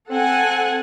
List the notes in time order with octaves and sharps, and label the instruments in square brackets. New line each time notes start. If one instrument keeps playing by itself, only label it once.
[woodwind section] C4 [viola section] A4 F#5 G#5